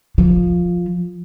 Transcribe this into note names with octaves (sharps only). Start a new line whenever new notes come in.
F3